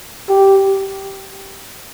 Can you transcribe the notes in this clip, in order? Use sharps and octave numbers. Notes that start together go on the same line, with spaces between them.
G4